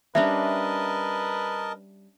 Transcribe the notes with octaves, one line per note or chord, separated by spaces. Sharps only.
G3 C#4 D4 A#4 B4 D#5 E5 A5